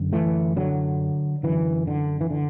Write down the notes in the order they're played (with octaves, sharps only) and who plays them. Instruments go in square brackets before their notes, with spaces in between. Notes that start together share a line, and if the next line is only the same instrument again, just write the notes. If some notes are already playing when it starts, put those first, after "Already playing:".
Already playing: [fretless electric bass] F#2 D3
E3 A3
D3 F#3
F#2 D3 E3
D3
E3
D3